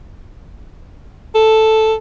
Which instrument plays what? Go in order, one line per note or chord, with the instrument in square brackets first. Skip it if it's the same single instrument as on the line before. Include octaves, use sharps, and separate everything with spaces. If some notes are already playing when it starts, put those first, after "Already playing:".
[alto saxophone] A4